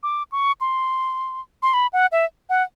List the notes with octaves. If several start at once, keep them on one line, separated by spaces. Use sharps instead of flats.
D6
C#6
C6
C6
B5
F#5
E5
F#5